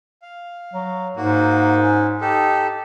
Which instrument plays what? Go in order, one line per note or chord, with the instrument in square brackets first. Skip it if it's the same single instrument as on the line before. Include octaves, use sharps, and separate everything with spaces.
[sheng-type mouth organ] F5
[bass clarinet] F#3
[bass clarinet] G#2 [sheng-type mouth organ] A#3 F#4
[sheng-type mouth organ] C#4
D#4 G4 A4